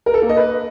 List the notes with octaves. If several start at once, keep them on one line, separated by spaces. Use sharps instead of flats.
A#4
A4
A#3
D#5
B4